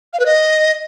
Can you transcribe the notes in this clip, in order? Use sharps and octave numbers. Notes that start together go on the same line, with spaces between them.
F5
B4
D#5